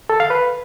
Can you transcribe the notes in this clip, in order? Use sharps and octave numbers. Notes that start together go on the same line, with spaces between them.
A4
F5
B4